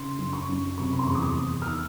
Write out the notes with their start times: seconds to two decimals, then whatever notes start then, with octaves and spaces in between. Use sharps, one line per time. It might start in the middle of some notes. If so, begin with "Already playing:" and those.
Already playing: C#3 C6
0.18 F#2
0.33 C#6
0.49 F#2
0.78 C3 C#6
0.93 B5
0.99 C6
1.07 E2 C#6
1.15 D6
1.22 D#6
1.37 E2
1.62 F6
1.67 D#3 E6